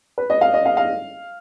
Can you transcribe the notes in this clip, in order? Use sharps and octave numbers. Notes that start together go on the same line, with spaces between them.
B4
D#5
F5
D#5
F5
F5